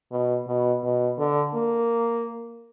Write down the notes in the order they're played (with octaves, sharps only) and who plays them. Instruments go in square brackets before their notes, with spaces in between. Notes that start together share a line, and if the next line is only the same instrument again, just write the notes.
[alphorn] B2
B2
B2
D3
A#3